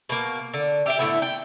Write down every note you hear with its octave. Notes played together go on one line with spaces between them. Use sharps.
B2 A#3
D3
G4 E5 G5
A2 D3 B3 E4
G5